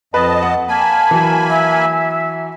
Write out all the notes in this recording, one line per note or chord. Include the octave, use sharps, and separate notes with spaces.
F2 B4 D#5 A5
F#5
A#3 G#5 A5 B5
E3 F#3
E5